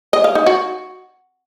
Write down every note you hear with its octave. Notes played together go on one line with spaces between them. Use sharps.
D#5
F5
D#4
F#4